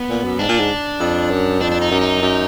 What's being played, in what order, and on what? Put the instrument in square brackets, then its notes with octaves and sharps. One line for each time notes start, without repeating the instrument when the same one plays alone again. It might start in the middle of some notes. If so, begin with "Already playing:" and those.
Already playing: [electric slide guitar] B3
[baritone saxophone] A#2
F#2
[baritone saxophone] G#2 [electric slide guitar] D4
[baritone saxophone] A#2
G#2
F2
F#2
[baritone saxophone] F2 [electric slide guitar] D4
[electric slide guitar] D4
D#4
[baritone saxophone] F#2
[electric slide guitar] D#4
[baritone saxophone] F#2